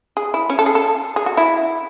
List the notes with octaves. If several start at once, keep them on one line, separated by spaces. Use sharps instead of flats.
G#4
E4
C#4
A4
G#4
A4
G#4
F#4
E4